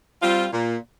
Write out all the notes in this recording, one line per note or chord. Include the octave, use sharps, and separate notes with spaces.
G3 C4 F4
A#2